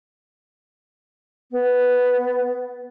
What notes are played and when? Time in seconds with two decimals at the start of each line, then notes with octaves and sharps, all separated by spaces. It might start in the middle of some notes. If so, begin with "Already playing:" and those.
1.51 B3